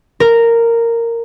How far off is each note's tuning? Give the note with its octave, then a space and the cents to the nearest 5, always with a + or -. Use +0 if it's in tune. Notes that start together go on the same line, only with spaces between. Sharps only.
A#4 -10